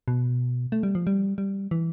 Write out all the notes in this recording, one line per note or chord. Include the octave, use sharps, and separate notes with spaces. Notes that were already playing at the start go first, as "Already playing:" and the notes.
B2
A3
G3
F3
G3
G3
E3